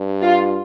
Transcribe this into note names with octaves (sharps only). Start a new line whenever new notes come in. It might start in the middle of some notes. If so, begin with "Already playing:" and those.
Already playing: G2
F4